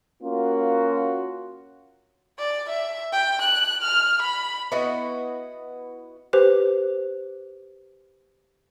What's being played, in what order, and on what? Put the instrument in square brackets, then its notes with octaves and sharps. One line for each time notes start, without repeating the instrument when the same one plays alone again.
[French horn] A#3 [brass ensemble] C#4 F4 F#4
[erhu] D5
E5
G5
F#6
F6
B5
[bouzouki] B3 E4 F#4 D#5
[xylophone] G4 B4 C5